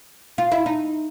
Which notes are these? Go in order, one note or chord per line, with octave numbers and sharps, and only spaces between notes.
F4
E4
D#4